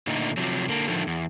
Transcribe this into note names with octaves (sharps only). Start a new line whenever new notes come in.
A#2 D3 A3 D#4
C3 F3 F#3
D3 A#3
A2 D3 D#3 F3 A3
E2